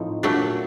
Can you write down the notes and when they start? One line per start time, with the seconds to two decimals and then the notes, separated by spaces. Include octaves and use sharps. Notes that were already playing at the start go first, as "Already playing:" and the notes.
Already playing: A2 F3 C4 D#4
0.23 A#2 F#3 A3 D4